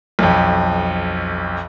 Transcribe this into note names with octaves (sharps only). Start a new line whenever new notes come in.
B1 F2